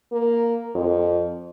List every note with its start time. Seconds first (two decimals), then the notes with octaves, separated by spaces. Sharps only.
0.12 A#3
0.75 F2